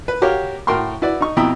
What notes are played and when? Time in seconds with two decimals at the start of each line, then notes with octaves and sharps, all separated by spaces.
0.08 B4
0.22 F#4 G4 A#4 C#5 F5 G5
0.67 A2 F#4 A#4 G5 C6 C#6
1.02 E4 F#4 B4 D5
1.21 D#4 C#6
1.36 F2 B2 E4 G5 A#5 D#6